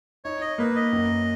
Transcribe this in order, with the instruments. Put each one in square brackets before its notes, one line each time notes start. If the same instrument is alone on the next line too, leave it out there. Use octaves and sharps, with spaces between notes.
[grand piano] D#4 [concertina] C#5
[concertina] D#5
[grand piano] A#3 [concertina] B4
[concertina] D#5
[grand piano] F#2